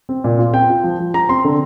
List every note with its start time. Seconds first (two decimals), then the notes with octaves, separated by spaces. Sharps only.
0.09 C4
0.24 A#2
0.39 F4
0.54 C4 G5
0.70 F4
0.84 F3
0.99 F3
1.14 F3 A#5
1.29 C4 C6
1.44 D3